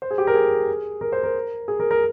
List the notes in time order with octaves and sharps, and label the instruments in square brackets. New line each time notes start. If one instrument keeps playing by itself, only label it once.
[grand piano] C5
G#4
G4
A#4
G#4
A#4
C5
A#4
G#4
A#4
A#4